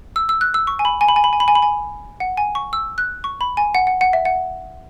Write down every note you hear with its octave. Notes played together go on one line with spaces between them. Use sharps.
E6
E6
F#6
E6
C#6
G#5
B5
G#5
B5
G#5
B5
G#5
B5
G#5
B5
G#5
F#5
G#5
C#6
E6
F#6
C#6
B5
G#5
F#5
F#5
F#5
E5
F#5